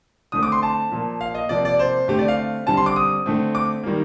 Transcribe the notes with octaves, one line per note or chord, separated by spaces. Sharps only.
D3 A3 C4 D#6
D6
C6
A5
A#2 F3 A#3
F5
D#5
C3 F3 A#3 D5
D5
C5
D3 A3 C4 G4
D5
F5
D3 G3 C4 A5
C6
D6
D#6
D3 A3 C4
D6
D#3 G3 A#3